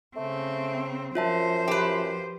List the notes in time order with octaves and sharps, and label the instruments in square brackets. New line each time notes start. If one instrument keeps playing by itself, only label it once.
[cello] C#3 C4 [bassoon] A3
[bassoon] F#2 [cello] F3 C5 [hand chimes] F4 E5 A5
[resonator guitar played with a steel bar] G4 B4